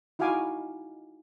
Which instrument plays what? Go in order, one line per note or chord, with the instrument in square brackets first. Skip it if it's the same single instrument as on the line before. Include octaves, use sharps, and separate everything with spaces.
[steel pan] D#4 E4 F#4 F5 G#5 D6